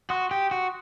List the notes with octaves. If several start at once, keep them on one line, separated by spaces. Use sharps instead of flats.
F#4 C6 D#6 F#6
G4
F#4